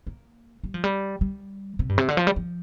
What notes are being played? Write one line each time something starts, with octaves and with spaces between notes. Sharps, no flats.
A#3
G3
F3
G3
G3
C3
G2
C3
D3
F3
G3
F3